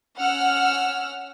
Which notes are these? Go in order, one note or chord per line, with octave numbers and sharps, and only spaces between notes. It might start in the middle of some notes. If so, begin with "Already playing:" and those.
C#4 F#5 E6 F6